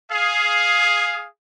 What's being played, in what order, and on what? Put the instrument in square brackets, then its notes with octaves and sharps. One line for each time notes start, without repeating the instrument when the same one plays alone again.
[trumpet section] G#4 F5